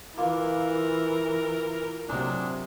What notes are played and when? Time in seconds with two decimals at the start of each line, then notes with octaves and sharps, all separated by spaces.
0.18 E3 A#3 F4 A#4
2.09 C3 F#3 G#3 D4 A#5